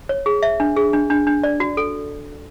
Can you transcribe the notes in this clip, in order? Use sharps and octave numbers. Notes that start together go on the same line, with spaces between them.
C#5
G#4
E5
D4
G#4
D4
D4
D4
D5
F#4
A4